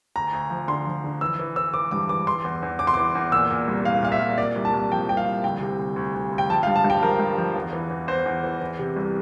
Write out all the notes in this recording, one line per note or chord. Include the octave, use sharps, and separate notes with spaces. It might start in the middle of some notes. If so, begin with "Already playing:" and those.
D2 A#5
D2
F3
D3 C6
F3
D3
E3 E6
E3
E3 E6
E3 D6
G2 D6
E3 D6
E3 C6
E2
E2
E2 D6
C6
E3 D6
E2
A#2 E6
A#2
C2
A#2 F5
A#2 F5
E5
C2
A#2 D5
C2
A5
C2
F3 G5
C2 G5
F5
C2
D2 G5
C3
D2
D2
D2
D2
G5
F3 A5
F5
G2
A5
G2
G5
F3 A#4
G2
F3
E2
E3
E2
E2 C5
E2
E3
E3
C3
C2